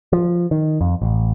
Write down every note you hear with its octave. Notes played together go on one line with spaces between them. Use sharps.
F3
D#3
F2
A1